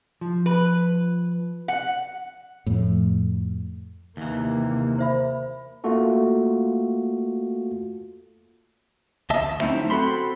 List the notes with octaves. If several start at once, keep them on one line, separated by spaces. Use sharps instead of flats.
F3
B4
F#5
F2 A2
D#2 C3 E3 A#3
C5 E5 B5
A3 A#3 F4 F#4 A4
D2 D#5 E5 A5
F#3 A3 C4 C#4 D#4 E4
C4 F#4 A4 B5 C6